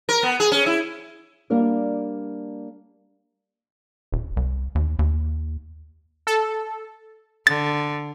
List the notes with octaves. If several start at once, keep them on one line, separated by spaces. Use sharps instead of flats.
A#4
B3
G#4
C#4
E4
G3 A#3 D4 A#4 D5
D#1
C2
D#2
D#2
A4
D3 A6